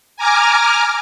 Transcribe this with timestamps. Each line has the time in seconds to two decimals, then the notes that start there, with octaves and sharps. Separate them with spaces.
0.17 G#5 A#5 D6 F6